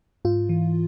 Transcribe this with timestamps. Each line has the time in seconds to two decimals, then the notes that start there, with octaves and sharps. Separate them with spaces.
0.25 G#2 F4
0.49 E3